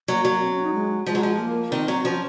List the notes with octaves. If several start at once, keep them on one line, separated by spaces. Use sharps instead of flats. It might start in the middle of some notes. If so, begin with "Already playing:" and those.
F#3 A#3
F#3
C4
C#4
D#4
G#3
F3 G#3
F#3
F3
A#3
D#3 C4
F#3
F3 C#4